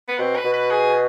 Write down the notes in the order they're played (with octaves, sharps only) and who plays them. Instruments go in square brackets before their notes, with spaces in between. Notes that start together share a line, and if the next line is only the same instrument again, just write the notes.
[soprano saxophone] B3
[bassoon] B2 [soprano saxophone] C4
[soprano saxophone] B4
[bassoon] B2
[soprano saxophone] B4
G#4